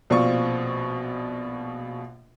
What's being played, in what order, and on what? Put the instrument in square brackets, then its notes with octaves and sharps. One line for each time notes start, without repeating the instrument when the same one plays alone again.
[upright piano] A#1 B2 C4 F4 D5 C#6